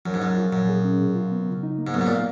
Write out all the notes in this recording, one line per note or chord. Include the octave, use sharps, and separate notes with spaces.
F#2 F3
G#2
F#2 F3
F4
F#2 A#2
G#4
C#4
B2
F4
B3
C#3
D#4
A#3
G#2
F#2 B3
G#2
A#2
F5